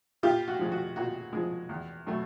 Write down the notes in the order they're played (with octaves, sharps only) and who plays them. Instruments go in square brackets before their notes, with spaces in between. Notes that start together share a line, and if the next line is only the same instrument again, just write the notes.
[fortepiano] A#2 F4 G4
F#4
F3 G#3
F#4
A#2 F#4
F3 G#3
E2
B2 F#3 A3